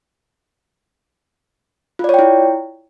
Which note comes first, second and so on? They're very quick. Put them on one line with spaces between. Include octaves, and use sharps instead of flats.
F4 D5 C#5 G5 E4